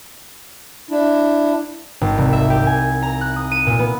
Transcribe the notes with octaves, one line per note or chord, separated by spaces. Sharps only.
D4 E4
G#1
C2
E5
G4
G#5
A#5
F#6
D#6
D#7
A#2
B3